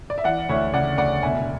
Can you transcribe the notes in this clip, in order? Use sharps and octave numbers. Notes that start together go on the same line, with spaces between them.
D5
E5
E3 D5 F#5
D2 C#5 E5
C#3 D5 F#5
D2 D5 F#5
E1 E5 G#5